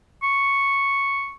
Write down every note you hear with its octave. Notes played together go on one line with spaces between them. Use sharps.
C#6